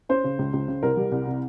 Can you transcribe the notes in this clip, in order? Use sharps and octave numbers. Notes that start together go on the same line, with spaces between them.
C#4 C5
C#3
C#2
C#2
C#3
C2 A#4
G3
C2
C3